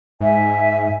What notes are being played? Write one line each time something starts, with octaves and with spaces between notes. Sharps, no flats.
G#2 E5 G#5